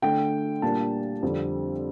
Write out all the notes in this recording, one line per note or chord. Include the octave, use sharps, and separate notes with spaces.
D3 A3 D4 G5
A#2 G3 A#3 D4 A5
F2 D3 G3 C4